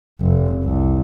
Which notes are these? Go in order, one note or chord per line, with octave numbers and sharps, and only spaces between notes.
F1
C2